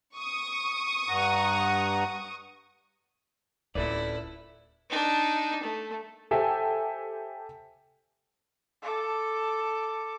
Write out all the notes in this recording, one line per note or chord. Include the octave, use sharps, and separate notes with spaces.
C#6 D#6
G2 F#5 A#5
D1 C#4 E4 A4 B4 D5
D4 D#4
A3
G4 A4 C5 E5 G5 G#5
A4 D6